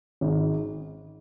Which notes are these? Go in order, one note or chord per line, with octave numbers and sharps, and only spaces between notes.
G#1 G#2 D#3